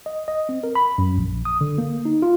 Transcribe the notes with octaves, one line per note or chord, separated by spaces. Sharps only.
D#5
D#5
C4
A#4
B5
F#2
A#1
D#6
D3
A#3
D#4
F4